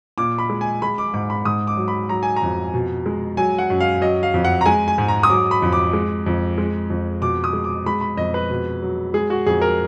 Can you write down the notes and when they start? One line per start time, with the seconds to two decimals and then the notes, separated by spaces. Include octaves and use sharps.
0.18 A#2 D6
0.38 B5
0.50 G#3
0.61 G#5
0.82 G#3 B5
0.98 D6
1.14 G#2 D6
1.30 B5
1.45 G#2 D#6
1.67 D6
1.77 F#3
1.88 B5
2.09 F#3 A#5
2.23 G#5
2.36 A#5
2.42 F2
2.74 B2
3.06 G#3
3.37 F#3 G#5
3.58 F#5
3.70 F#2
3.80 F5
4.01 F#3 D#5
4.23 F5
4.34 F2
4.45 F#5
4.61 A#5
4.66 G#3 G#5
4.88 G#5
4.98 G#2
5.08 A#5
5.23 D#6
5.30 F#3 D6
5.51 B5
5.62 F2
5.72 D6
5.93 G#3
6.26 F2
6.58 G#3
6.90 F2
7.21 B2 D6
7.44 D#6
7.53 G#3
7.64 D6
7.86 G#3 B5
8.01 B5
8.17 F2 D#5
8.34 B4
8.50 B2
8.82 F#3
9.14 G#3 G#4
9.30 F#4
9.46 F2 G#4
9.61 A#4